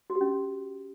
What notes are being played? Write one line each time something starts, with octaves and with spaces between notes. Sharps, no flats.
F#4
G4
C#4